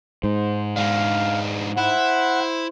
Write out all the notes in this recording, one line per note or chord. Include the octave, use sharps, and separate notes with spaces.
G#2 C5
G#3 D4 F5
E4 C5 F#5